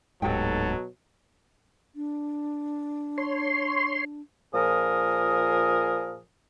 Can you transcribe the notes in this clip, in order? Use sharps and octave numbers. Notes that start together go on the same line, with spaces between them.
D1 G#2 B2 F#3 D#4 G4 A4 G5
D4
C#5 C6
A#2 F3 G#4 A#4 D#6